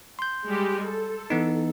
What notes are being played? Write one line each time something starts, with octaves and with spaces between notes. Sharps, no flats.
C6 G6
G3 G#3 G4
A4
E3 B3 D#4